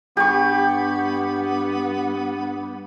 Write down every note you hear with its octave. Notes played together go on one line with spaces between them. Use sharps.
G2 B3 G4 C#6